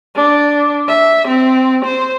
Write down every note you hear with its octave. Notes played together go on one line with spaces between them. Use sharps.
D4
E5
C4
C5